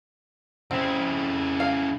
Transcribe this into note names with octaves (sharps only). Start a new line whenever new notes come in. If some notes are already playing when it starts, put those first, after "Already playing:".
C#3 C4 E4
F5